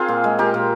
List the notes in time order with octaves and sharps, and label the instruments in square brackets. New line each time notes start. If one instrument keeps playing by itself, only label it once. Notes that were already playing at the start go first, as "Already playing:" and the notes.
Already playing: [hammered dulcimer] C4 F4 G#4 A#4
A#2
G#3
A#2 G4 A#4
A#2